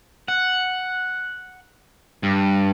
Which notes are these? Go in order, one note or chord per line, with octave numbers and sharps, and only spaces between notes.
F#5
G2